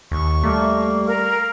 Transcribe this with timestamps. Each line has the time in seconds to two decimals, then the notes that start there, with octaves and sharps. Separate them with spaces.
0.11 D#2 C#6
0.44 G3 A3 A#3
1.07 A#4 F5